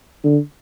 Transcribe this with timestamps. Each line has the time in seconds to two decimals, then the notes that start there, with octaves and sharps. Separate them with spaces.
0.24 D3